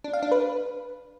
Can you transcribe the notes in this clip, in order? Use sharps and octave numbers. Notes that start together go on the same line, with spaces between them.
D4
F5
D4
B4